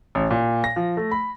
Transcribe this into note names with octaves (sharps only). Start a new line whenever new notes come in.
A1
A#2
A#6
F3
A3
B5